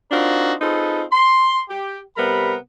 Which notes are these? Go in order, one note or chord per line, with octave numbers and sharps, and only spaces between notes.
C4 D4 D#4 F4 F#4 A#4
C4 D#4 F4 G#4 A4 B4
C6
G4
C3 G3 B3 A#4 B5